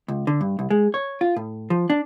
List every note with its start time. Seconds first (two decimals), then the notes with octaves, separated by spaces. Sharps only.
0.08 C#2
0.27 D3
0.41 G2
0.59 C2
0.70 G#3
0.94 C#5
1.21 F4
1.36 A2
1.70 F3
1.90 D4